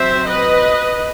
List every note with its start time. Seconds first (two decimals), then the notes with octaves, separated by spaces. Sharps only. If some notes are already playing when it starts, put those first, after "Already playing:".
Already playing: F#3 C4 C5 E5
0.27 B4 D#5